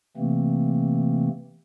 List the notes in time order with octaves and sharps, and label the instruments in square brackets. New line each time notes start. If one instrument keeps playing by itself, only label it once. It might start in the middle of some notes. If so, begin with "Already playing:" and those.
[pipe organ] C3 E3 A3 A#3 C4